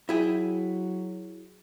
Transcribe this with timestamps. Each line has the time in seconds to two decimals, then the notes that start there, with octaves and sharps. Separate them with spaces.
0.09 F#3 E4 G#4 G5